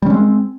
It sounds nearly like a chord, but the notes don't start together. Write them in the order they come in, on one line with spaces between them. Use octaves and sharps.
G3 C#4 G#3 C4